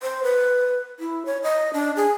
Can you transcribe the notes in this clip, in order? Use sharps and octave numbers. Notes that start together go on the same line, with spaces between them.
C5
B4
E4
C#5
D#5
D4
G#4